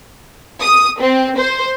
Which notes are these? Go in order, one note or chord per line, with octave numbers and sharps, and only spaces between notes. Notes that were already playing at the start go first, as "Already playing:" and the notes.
D#6
C4
C5